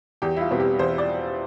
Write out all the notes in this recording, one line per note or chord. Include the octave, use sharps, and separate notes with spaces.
E2 G4
E4
F4
B2 G3 C4
G4
E2 C5
D5